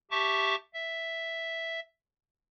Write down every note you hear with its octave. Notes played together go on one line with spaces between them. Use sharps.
G4 E5 A5 C#6 D6
E5